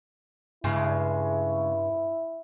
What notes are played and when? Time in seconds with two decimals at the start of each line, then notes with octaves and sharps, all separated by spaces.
0.64 G2 C#3 G#3 E4